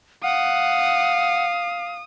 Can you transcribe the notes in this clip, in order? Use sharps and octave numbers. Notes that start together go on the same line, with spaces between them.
F5 F#5 D#6